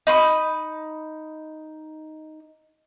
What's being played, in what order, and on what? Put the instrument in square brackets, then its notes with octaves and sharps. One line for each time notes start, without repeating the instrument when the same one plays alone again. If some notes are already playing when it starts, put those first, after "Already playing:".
[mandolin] D#4 B5 C6 D#6